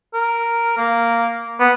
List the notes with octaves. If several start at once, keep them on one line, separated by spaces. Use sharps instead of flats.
A#4
A#3
B3